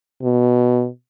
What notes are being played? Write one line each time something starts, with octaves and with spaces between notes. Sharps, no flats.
B2